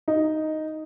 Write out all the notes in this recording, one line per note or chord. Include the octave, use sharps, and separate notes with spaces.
D#4